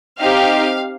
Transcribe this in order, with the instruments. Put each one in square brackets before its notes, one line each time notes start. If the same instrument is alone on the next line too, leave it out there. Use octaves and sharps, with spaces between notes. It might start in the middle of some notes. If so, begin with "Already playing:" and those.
[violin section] C4 D#4 G4 F5